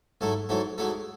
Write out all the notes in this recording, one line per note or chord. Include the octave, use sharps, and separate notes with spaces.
G#2 F#3 A3 E4 A4
G#2 F#3 A3 E4 A4
G#2 F#3 A3 E4 A4